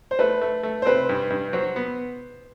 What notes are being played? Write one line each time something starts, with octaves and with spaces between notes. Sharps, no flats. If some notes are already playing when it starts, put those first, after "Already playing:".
C5
A3 B4
A3
A3
C5
C4 B4
G2
G2
F#3 C5
B3